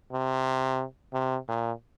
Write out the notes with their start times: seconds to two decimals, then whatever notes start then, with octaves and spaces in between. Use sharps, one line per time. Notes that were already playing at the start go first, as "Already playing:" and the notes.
0.13 C3
1.14 C3
1.48 A#2